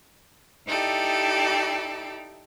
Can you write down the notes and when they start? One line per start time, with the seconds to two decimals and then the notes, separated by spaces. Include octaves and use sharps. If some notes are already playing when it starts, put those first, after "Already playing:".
0.66 D#4 E4 G4 A4 D5